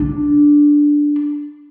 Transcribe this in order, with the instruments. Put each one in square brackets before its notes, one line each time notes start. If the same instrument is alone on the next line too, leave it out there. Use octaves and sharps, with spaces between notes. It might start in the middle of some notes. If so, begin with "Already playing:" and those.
Already playing: [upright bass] D4